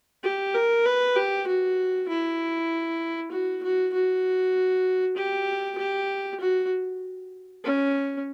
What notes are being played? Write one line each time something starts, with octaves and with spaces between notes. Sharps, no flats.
G4
A#4
B4
G4
F#4
E4
F#4
F#4
F#4
G4
G4
F#4
C#4